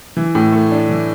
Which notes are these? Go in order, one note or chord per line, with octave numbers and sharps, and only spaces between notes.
E3
A2
A3
D4
E3